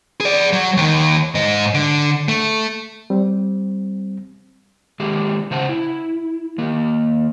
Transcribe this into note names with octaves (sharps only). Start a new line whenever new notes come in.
G#4 D5
F#3
D#2 D#3
G#2 D#5
D3
A3
G3 C4
D#3 G#3 G4 G#4
C#3 C5 F#5 A5
E4
D#3 A#3